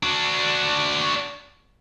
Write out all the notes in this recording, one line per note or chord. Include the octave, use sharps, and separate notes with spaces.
D4 F#4